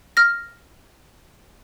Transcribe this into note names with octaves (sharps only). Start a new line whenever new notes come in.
F6 A#6